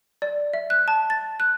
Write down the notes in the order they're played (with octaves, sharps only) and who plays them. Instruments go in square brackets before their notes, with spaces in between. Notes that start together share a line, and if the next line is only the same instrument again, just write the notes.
[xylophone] D5
E5
F#6
A5
A6
F#6